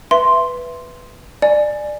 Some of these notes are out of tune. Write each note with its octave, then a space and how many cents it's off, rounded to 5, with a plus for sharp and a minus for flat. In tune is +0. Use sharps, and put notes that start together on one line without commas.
B4 +0 E5 +15 C6 +0
D5 +20 G#5 +10